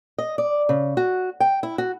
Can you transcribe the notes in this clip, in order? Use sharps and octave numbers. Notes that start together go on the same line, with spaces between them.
D#5
D5
C#3
F#4
G5
E4
F#4